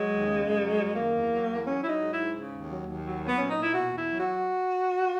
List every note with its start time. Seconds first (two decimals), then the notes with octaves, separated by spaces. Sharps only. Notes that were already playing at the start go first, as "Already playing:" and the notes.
Already playing: F#3 G#3
0.09 D#2
0.26 C#3
0.43 F#2
0.60 F#3
0.78 F#2
0.84 G#3
0.96 D#3 A#3
1.13 E2
1.31 F#3
1.48 E2
1.65 F#3 C#4
1.82 F#3 E4
1.88 D#4
1.99 G#2
2.11 E4
2.17 G#2
2.35 C#3
2.52 D#2
2.69 F#3
2.86 D#2
3.04 F#3
3.21 F#3
3.27 B3
3.38 A#2 C#4
3.50 D#4
3.55 A#2
3.62 E4
3.73 B2 F#4
3.90 E2
3.97 E4
4.09 F#3
4.20 F#4